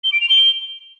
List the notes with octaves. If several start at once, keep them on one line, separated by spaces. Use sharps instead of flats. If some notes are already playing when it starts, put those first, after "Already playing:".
G7
D7
F7
G7